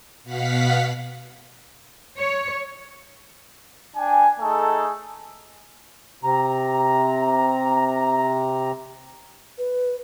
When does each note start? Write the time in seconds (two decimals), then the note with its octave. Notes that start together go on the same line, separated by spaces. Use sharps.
0.24 B2 F5 F#5 B6
2.18 C#5
3.96 D4 G5 G#5
4.40 A3 D#4 G#4 A4
6.23 C3 A#5
9.58 B4